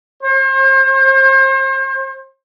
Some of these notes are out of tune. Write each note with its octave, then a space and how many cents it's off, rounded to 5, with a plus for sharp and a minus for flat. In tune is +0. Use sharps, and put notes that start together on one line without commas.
C5 +40